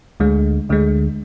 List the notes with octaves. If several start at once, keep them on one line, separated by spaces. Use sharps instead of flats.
D2 D3 G#3
D2 D3 G#3